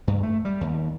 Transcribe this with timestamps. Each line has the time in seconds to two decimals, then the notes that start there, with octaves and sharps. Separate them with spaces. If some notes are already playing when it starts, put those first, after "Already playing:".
0.07 G2
0.23 A3
0.45 G3
0.61 D#2